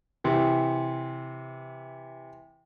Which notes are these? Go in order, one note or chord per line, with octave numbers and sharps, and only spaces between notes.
C3 E3